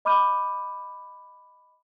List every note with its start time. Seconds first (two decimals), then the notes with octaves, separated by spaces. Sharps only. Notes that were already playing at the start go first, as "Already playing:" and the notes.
0.05 D#5 B5 D6 F6 G6 D#7